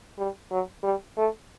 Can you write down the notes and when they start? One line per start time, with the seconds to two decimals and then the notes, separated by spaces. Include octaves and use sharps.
0.18 G3
0.51 F#3
0.83 G3
1.17 A3